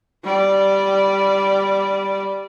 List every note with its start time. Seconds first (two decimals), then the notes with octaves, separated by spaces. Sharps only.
0.24 G3 D5